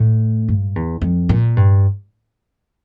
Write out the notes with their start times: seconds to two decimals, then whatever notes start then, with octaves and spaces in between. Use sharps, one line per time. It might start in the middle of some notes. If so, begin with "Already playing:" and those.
Already playing: A2
0.48 G2
0.76 E2
1.02 F2
1.29 A#2
1.57 G2